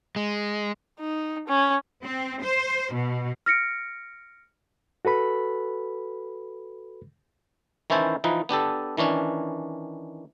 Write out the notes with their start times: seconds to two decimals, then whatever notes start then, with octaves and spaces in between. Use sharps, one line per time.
0.16 G#3
1.00 D#4
1.48 C#4
2.03 C4
2.43 C5
2.93 B2
3.46 F6 A#6 C#7 D7
5.05 F#4 A4 B4 B5
7.90 D#3 E3 C#4 E4 C5 A5
8.24 E3 F3 D#4 B4
8.49 B3 D4 G4 A4
8.97 D#3 E3 C#4 D4